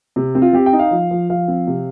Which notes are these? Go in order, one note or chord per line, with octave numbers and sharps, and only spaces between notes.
C3
C4
F4
C4 G4
G5
D#4
F5
F3
F3
F3 F5
C4
C3